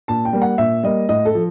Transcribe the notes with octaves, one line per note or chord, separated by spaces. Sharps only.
A#2 A5
G5
G3 A#3
F#5
A#2 E5
G3 A#3 D#5
A2 D#5
A4
F3